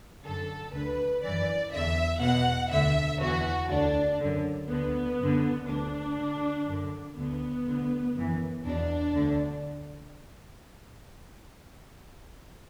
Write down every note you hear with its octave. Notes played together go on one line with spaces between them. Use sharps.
F#2 D3 A4
D2 D3 B4
F#2 E3 D5
E2 D3 E5
E2 B2 F#5
D2 D3 E5
E2 E3 F#4
D2 D3 D4
F#2 D3
D2 D3 B3
F#2 D3
D2 D3 D4
D2 D3
F#2 D3
D2 D3 B3
D2 D3
F#2 E3
E2 B2 D4
D2 D3